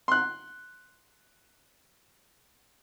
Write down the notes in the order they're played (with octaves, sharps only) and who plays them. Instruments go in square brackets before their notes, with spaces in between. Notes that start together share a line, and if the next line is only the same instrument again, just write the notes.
[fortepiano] C6 F#6